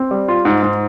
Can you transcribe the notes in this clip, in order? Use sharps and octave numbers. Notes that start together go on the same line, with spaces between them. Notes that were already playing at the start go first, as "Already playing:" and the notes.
Already playing: C4
G3
F4
G#2
G#2